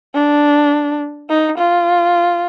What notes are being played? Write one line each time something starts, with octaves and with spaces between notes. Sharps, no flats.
D4
D#4
F4